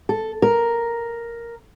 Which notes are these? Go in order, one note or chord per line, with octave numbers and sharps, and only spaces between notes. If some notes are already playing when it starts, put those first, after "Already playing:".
A4
A#4